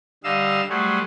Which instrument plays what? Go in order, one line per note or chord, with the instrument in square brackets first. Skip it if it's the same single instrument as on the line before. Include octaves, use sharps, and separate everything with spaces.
[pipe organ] D3 G3 D#5 F5 E6
F#3 G3 A3 F#4 G#4 C5